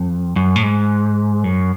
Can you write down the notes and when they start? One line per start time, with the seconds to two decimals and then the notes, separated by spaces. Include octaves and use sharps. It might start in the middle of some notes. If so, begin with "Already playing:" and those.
Already playing: F2
0.36 F#2
0.56 A2
0.63 G#2
1.44 F#2